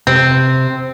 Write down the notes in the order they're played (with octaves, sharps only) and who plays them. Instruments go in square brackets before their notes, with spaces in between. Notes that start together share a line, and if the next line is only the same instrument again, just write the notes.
[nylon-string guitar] C3 [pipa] C4